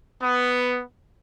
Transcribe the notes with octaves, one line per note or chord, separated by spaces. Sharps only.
B3